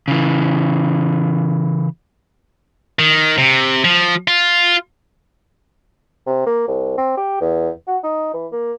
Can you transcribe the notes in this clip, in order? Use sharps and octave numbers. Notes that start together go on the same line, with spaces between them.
C#3 E3
D#3
C3
F3
F4
C3
A#3
C2
C4
G4
E2
F#4
D#4
E3
A#3